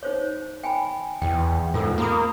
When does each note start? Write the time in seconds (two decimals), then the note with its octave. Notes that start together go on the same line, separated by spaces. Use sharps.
0.03 D#4 C5 C#5
0.64 G5 G#5 B5
1.22 E2 G5
1.74 G#2 F4 A4 E6
1.98 A#3 A#5 B5 D#6